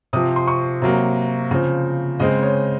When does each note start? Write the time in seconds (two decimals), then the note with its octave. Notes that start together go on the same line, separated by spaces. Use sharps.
0.13 C3 F3 C4 D#6
0.36 C6
0.48 C#6
0.82 C3 F#3 A#3
1.51 C#3 F3 C4
2.20 C#3 G#3 C4 D#5
2.43 C#5